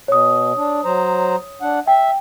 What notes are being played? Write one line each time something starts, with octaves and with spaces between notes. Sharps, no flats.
B2 C#5 D#6
D4
F#3 C5 A#5
D4 F#5
E5 G5